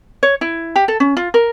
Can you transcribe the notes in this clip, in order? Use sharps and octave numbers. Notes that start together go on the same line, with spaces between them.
C#5
E4
G4
A4
C#4
F4
A#4